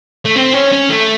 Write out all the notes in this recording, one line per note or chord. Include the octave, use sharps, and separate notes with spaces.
A3
C4
C#4
C#4
A3